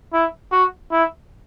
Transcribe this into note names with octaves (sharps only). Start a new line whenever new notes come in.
E4
F#4
E4